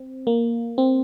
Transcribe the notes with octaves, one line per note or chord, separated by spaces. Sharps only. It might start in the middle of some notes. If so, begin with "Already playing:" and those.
Already playing: C4
A#3
C4